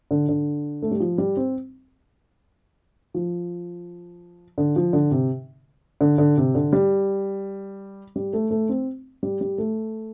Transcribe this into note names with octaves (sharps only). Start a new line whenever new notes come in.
D3
D3
A3
G3
F3
G3
C4
F3
D3
F3
D3
C3
D3
D3
C3
D3
G3
G3
A3
A3
C4
G3
G3
A3